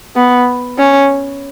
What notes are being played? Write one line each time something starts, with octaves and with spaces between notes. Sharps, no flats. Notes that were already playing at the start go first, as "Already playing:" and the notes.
B3
C#4